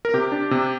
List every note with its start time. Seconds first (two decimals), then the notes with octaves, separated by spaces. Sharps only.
0.05 A#4
0.14 C3 G4
0.32 D4
0.51 C3